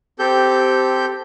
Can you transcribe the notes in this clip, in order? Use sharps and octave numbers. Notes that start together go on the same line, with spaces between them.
C4 G4 A4 G6